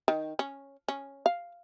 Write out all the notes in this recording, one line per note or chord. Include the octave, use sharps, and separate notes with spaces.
D#3
C#4
C#4
F5